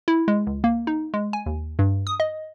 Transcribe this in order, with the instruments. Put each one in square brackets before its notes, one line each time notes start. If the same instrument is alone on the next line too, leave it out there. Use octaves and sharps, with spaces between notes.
[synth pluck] E4
G#3
C#2
A#3
D#4
G#3
G#5
D#2
G2
D#6
D#5